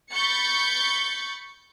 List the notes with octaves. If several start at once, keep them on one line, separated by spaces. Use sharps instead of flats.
B5 C#6 G6 A6 C#7